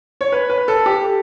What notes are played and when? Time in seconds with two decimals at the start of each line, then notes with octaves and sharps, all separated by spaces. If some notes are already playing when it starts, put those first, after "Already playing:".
0.21 C#5
0.32 B4
0.50 B4
0.68 A4
0.86 G4